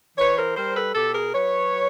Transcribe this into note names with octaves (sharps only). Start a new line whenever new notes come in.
E3 B4 C#5
A#4 C5
G3 A#4 C5
A4 B4
B2 G4 A4
G#4 A#4
F#3 B4 C#5
F#3